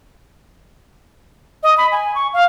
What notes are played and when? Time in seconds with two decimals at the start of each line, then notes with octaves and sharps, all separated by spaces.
1.63 D#5
1.78 B5
1.92 G#5
2.15 C#6
2.33 F5